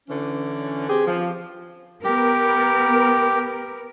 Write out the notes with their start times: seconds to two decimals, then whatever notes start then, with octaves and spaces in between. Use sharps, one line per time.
0.09 D3 E3 C#4
0.89 C4 G4 G#4
1.07 F3
2.04 B3 G4 A#4